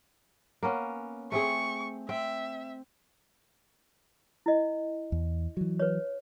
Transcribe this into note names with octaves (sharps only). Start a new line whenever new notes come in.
A#3 B3 C#4
A3 C4 G#4 C#6
C4 E5
E4 D#5
E2
E3 F#3
B4 C#5